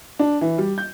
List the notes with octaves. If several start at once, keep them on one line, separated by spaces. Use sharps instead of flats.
D4
E3
G3
G6